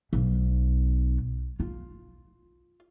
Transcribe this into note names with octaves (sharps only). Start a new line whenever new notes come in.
B1
F4